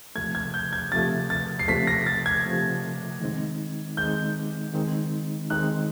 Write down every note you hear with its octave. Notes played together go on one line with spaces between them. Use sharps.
C3 F3 A3 G#6
G#6
G6
G#6
C3 F3 A3 A6
A6
C7
C3 F3 A3 B6
A#6
A6
G#6
C3 F3 A3
D#3 G#3 C4 D#4
D#3 G#3 C4 D#4 G6
D#3 G#3 C4 D#4
D#3 G#3 C4 D#4 F#6